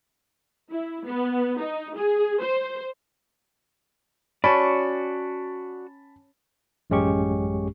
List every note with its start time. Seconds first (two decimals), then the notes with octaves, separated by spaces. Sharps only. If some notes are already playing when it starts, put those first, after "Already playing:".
0.71 E4
1.06 B3
1.59 D#4
1.96 G#4
2.41 C5
4.44 C#4 F#4 D5 A5 B5
6.90 A1 F#2 G#3 C#4 G4 C#6